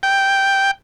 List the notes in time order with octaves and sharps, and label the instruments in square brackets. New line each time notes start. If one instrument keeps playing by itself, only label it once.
[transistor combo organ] G5